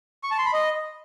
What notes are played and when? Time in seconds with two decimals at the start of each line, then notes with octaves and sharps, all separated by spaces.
0.23 C#6
0.31 A5
0.38 C6
0.46 B5
0.53 D#5